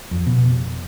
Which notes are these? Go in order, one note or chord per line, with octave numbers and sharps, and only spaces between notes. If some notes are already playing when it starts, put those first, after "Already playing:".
F2
B2
F1